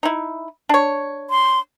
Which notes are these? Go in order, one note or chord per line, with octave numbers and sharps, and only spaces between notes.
D#4 E4
D4 C#5
C6